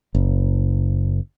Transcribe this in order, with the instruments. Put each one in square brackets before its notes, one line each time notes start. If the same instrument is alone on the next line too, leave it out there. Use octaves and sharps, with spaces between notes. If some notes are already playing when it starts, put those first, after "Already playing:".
[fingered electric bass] F#1